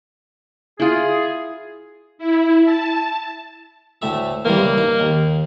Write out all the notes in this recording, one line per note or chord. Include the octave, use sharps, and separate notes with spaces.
E4 F4 G#4
E4
A5
D2 A2 E5
E2 E3 G3 A#3
C#3
D#4
D#2